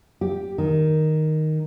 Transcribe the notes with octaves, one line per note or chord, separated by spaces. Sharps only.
G4
D#3